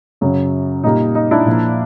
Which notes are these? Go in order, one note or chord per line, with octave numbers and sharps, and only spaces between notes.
F#2 C#3 F#3
A#2 G3 A#3 D#4
D#4
D4 E4
A#2 F3 A#3